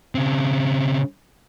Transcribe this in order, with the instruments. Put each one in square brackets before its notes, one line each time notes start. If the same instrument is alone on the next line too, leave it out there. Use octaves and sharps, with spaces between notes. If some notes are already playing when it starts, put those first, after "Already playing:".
[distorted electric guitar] C#3 C4